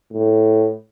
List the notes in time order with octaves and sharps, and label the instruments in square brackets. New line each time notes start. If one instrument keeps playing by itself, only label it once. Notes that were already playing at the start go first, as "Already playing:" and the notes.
[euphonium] A2